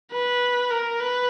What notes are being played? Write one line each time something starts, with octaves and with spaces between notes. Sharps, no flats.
B4
A#4
B4